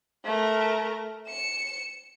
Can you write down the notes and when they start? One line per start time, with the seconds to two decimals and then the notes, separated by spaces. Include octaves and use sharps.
0.25 A3 A#4
1.27 C#7 E7